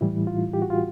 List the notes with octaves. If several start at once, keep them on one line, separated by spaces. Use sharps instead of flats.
A2 E3 G3 E4
F4
G4
F#4
F4